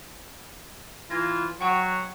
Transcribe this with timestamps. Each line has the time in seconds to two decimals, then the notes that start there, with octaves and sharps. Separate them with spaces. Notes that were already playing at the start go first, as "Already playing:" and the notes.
1.10 E3 F4 G#6 A#6
1.61 F#3 F#4 C#5 F#5 G5 C#6